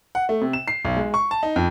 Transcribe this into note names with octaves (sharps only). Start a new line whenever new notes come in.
F#5
A3
C3
E7
C7
B1
G#3
C#6
A5
D#4
F2